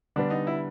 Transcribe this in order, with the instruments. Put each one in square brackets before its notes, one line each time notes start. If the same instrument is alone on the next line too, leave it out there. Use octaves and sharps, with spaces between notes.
[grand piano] D3 G3 B3 [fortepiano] D4
[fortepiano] D#4
E4